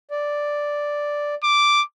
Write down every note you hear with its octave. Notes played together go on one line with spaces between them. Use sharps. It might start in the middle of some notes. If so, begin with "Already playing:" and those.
D5
D6